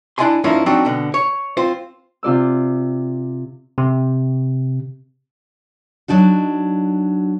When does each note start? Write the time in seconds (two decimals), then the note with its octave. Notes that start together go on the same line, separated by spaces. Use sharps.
0.18 D4 E4 D5 D#5 G#5 C6
0.44 G2 F3 A#3 C#4 D#4 E4
0.66 F#3 G3 C4 D4 D#4 F#4
0.85 B2 D3
1.14 C#5
1.57 C4 F4 C5
2.23 C3 F4 D5 E6
3.78 C3
6.08 F#3 D4 D#4 F#4